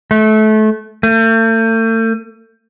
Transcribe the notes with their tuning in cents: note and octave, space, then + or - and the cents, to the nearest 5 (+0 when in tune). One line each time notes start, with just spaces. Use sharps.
A3 -25
A3 +40